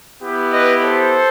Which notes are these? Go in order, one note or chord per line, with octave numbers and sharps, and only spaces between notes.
B3 E4 G4
B4 D#5
A4 C5